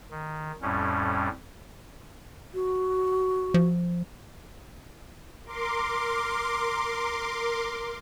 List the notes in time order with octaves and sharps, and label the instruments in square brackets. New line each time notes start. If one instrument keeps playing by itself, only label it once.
[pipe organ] D#3
F2 A2 G3 C#4
[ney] F#4
[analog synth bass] F3
[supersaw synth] A#4 C6 D6